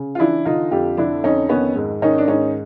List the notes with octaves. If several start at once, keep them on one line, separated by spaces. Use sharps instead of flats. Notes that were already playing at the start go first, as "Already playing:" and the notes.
Already playing: C#3
F4
E3 D4 E4
D3 D#4 F4
F2 F4 G4
D3 D4 E4
F2 C#4 D#4
D#3 B3 C#4
G#2
D#3 C#4 D#4
D4
G#2 C#4 D#4